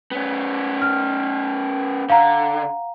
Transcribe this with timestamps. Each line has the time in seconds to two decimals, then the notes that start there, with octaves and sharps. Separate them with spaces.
0.11 B3 C#4
0.82 F6
2.10 D3 F5 F#5 A#5